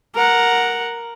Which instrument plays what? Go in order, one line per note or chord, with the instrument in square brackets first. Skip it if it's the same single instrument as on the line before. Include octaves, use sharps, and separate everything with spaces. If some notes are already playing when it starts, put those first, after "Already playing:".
[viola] A#4 F#5